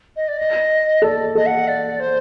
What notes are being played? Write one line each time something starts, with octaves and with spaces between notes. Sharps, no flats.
D#5
D5
D#5
A4 D5
A4 D#5
F#5
D5
C5